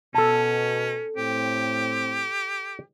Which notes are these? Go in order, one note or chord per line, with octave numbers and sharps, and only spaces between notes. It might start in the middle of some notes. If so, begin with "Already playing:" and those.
B2 C#4 A4 A5
A2 C4 G4